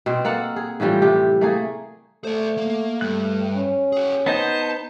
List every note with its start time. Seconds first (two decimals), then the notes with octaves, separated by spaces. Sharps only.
0.06 B2 C4
0.25 A#3 A4 F5 F#5
0.56 G#4
0.80 A2 E3 F3 G3
1.02 C3 G4
1.41 A3 A#3 G#4
2.24 A3 C5 D5
2.58 A#3
3.01 G2 A3 F#6
3.56 C#4
3.92 F#4 G#4
4.26 B3 D#4 C5 A5